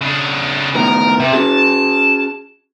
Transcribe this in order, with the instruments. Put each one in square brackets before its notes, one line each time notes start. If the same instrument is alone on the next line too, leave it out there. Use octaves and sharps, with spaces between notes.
[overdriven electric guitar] C#3 D4
[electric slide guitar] A2 D#3 B3 [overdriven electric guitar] A#4
[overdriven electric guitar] C3
[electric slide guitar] C#4 F#4 G#4 [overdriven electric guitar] A5